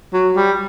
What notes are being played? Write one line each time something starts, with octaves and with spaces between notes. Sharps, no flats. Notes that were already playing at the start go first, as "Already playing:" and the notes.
F#3
G3